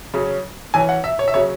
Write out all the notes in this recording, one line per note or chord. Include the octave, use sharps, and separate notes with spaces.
C#3 F#3 C#4
E3 C#4 G#5
F#5
E5
C#5
E5
C#3 F#3 C#4 C#5